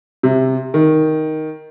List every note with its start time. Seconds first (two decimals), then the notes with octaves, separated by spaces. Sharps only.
0.23 C3
0.74 D#3